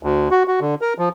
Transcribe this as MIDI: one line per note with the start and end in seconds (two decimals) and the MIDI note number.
0.03 0.29 38
0.31 0.43 66
0.47 0.60 66
0.61 0.75 50
0.81 0.94 70
0.98 1.09 53